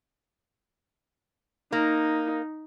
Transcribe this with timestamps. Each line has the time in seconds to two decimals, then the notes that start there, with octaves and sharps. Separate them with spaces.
1.72 A#3 D#4